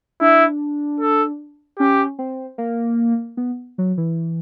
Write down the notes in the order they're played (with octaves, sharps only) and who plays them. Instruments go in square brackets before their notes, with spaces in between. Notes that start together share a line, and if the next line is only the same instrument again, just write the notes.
[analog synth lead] D4 [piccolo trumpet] E4
[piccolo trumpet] A4
[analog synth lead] C#4 [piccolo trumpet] G4
[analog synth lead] C4
A#3
B3
F#3
E3